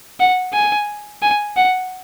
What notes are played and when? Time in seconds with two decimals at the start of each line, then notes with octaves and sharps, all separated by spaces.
0.20 F#5
0.54 G#5
1.22 G#5
1.57 F#5